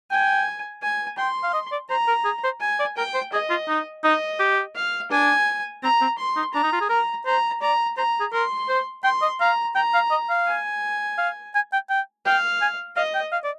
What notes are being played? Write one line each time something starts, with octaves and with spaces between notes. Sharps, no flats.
G5 G#5
G#5
G5 C6
F5
D#5
D5
C5 A#5
A#4
G#4
C5
G#5
D5
A#4 G5
C5
G#4 D#5
F4
D#4
D#4 D#5
G4
F5
D4 G#5
C4 A#5
C4
C6
D#4
D4 A#5
D#4
F4
G#4
A#4 A#5
C5 A#5
D5 A#5
C5 A#5
G#4
A#4 C6
C5
G5 C6
D#5
F5 A#5
G5 A#5
F5
D#5
F5
G#5
F5
G#5
G5
G5
F5 G5
G#5
D#5 F5
G5
F5
D5